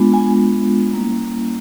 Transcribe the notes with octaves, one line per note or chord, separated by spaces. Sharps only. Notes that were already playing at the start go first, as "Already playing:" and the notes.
Already playing: G#3 B3 D4 F4
G#5
G3 A#3 C#4 E4